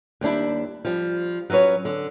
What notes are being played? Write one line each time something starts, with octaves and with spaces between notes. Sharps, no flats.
D#2 G3 D4 E4
F3 G3
F#3 C#4 F#4 B4 C#5
D3